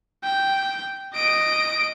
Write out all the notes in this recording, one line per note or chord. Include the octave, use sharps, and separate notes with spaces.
G5
D#5 D7